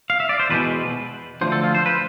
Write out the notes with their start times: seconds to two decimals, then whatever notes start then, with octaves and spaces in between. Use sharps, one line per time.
0.10 F5
0.20 E5
0.29 D5
0.39 C5
0.50 E2 B2 G#3 B4
1.41 D2 D3 F3 A3 C5
1.52 A4
1.64 F4
1.75 C5
1.86 B4